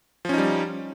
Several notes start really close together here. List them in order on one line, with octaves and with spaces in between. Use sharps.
F3 C#4 D#4 G3